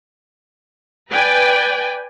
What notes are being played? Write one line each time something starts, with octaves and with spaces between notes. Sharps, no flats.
B4 D5 G5 G#5